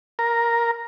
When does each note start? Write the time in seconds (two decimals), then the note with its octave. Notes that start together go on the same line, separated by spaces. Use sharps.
0.19 A#4